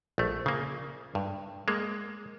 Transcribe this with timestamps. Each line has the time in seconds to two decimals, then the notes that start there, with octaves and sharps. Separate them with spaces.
0.18 A#1 A3
0.46 C#3 A#3
1.15 G2
1.68 G#3 A#3